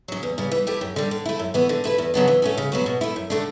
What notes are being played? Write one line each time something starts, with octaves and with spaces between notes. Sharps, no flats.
C#3 F#3
E2
C#3 G3
E3
A3 E4 G4
F#2
D3 G3
D3
A3 E4
F#2
E3 B3 F#4
D3
A3 E4 B4
E2
C#3 F#3 B3 D4
E3
A3 C#4 F#4
C#3
F#3 B3 F#4
B2
A3 E4
F#2
D3 A3 D4